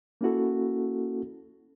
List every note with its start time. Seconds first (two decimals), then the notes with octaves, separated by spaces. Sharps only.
0.21 A#3 C#4 E4 F#4 A4